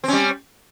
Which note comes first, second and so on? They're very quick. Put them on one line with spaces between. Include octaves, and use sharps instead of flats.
C4 C#4 G3